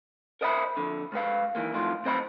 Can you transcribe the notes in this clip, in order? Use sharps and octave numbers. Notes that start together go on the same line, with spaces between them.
A#4 C5 D#5 E5 F#5 B5
F2 D3
G#2 G#3 B4 F5
D#3 E3 G#3 A#3
C2 F2 A2 D#4 F4
B1 C4 C5 D#5 B5